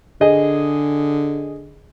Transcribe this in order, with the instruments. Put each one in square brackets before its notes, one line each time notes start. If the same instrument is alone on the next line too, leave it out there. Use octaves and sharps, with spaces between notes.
[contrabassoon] D3 [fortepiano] G#4 D#5